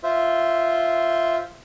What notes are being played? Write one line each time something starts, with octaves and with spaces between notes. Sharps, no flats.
F4 C5 E5